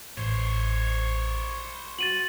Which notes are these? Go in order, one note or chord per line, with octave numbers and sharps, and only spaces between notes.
A1 C5 C#5
F#4 A6 D#7 F#7